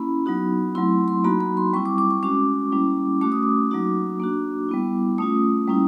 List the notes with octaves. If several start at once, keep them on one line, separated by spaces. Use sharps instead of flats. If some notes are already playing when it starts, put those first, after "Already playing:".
Already playing: A#3 C#4 E4 B5
F#3 B3 D#4 F#4
F#3 A3 C4 E4 C6
C6
F#3 A#3 D#4 F#4 B5
B5
C6
G3 C4 E4 C#6
D6
D6
C#6
G#3 C#4 F#4 D6
G3 A#3 C#4 E4
A3 C#4 F#4 D6
D#6
D6
F#3 A#3 D#4 F#4
A#3 D4 F#4
G3 B3 E4
A3 C#4 F4 D#6
G3 A#3 C#4 E4